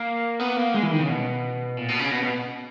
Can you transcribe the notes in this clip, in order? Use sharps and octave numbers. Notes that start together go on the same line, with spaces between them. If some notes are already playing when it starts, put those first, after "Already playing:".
Already playing: A#3
B3
A#3
G#3
E3
D#3
C#3
B2
A#2
B2
C#3
B2
B2